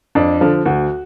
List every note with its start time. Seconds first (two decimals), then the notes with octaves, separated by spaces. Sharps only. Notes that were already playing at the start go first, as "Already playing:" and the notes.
0.15 F2 D4
0.41 D3 F3
0.66 D2 F#4